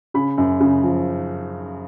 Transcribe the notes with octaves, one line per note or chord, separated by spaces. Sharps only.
C#3 B5
F#2
C#3
F3